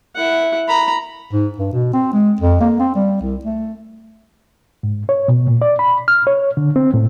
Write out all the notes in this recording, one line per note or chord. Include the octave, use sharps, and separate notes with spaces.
E4 F#5
A#5 B5
G#2
G2
B2
C4
G#3
F2
A#3
C4
G3
C2
A3
G#2
C#5
B2
A#2
D5
B5
F6
C#5
D3
C4
A2